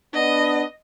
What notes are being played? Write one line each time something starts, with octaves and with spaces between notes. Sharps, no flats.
B3 D4 D#5